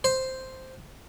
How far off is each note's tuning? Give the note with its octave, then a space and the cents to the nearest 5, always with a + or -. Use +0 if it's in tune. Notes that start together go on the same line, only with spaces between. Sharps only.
C5 +0